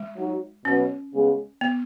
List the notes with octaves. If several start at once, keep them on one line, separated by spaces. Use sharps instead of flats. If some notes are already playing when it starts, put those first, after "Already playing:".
Already playing: G#3
F#3 D#4 F#4
B2 F#3 B3 C#4
C#3 G#3 B3 G#4
B3